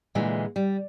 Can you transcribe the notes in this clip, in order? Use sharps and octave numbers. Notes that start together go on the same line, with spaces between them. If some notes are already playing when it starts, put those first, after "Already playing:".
A#2 D3 E3 G#3
G3